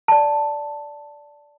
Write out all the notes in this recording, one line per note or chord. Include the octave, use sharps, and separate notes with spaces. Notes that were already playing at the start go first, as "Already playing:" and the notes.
D5 A5